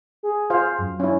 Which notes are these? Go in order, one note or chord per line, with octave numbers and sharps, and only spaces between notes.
G#4
F4 C5 F5
F#2
C#4 E4